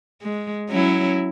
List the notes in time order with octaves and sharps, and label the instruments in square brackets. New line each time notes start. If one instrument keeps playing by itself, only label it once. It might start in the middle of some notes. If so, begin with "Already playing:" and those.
[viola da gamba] G#3
F#3 C#4 E4